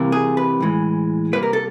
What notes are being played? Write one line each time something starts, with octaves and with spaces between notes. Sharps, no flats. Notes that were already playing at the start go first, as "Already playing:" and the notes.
Already playing: C2 C3 E3 G3 A#3
G#4
B4
A2 E3 G#3
C2 B2 G3 A#3 B4
A#4
A4